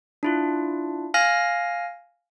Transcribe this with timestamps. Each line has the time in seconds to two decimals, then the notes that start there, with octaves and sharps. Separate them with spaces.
0.23 D4 E4 F4
1.14 F5 G#5 F6 A#6